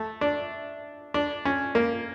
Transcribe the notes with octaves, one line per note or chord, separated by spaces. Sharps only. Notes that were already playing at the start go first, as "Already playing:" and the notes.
Already playing: A3
D4
D4
C#4
A#3